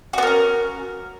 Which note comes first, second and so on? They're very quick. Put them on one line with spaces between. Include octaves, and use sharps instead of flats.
F#4 B3 A#4 C#4